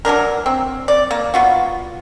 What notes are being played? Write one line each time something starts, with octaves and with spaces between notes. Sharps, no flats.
E3 F#3 D4 A#4
C4
D5
A#3
B3 F4 F#4